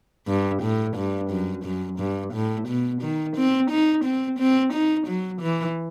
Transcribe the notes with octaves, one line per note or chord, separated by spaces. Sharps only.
G2
A2
G2
F#2
F#2
G2
A2
B2
D#3
C4
D#4
C4
C4
D#4
F#3
E3